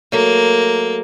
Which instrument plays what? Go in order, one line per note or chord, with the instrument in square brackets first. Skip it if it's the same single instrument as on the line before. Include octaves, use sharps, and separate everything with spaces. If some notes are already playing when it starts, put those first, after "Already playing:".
[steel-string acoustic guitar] F#3 A3 [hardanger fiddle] A#3